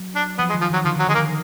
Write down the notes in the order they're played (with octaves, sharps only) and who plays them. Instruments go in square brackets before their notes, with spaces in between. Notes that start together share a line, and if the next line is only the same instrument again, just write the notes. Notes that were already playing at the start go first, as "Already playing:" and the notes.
Already playing: [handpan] F#3
[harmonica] D4
[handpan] F3 [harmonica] B3
[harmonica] G#3
[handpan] D#3
[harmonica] F3
[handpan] D#3 [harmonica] F#3
[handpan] D3 [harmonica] F3
[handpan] D#3 [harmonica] F#3
[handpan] D3 [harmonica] G#3
[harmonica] A#3
[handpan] D#3